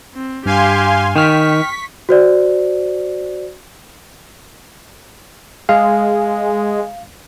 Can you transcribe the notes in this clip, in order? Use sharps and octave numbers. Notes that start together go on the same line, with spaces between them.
C4
G2 G4 F5 G#5 C6
D#3 G5 C#6 F6 B6
F#4 C5 D5
G#3 F5